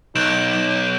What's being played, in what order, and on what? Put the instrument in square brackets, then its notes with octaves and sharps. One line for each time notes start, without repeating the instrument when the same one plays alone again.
[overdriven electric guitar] B1 [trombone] D#4 [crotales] G6 D7 E7